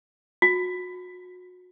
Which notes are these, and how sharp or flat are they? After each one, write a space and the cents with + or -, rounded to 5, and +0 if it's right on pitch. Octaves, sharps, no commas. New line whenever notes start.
F#4 -30